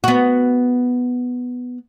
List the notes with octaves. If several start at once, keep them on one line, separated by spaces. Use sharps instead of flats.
B3 F#4